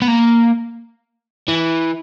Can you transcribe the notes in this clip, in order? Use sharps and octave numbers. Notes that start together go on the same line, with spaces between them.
B3
A#3
E3